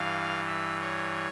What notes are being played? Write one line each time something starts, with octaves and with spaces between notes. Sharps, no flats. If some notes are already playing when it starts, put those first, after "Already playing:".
Already playing: G2 E3 F5
E5
C#5